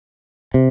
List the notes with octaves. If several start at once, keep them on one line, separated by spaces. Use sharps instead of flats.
C3